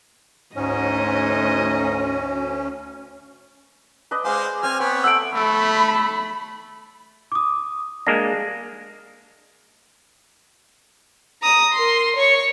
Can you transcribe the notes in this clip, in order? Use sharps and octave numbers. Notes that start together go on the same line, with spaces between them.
D2 G#2 A3 C#4 D#5
B4 D5 D#5
G#3 C5 F5 G#5 D6
C4 D5 G#5 F6
B3 B4 C#5 G5
A3 F#5 E6 D7
A3 B5
D6 D#6
G#3 A#3 D4 A#6
A#5 D#6
A#4 C6
C#5 C#6